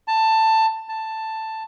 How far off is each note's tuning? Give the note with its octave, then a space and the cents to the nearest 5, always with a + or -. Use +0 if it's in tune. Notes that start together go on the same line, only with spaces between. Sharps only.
A5 +15
A5 +5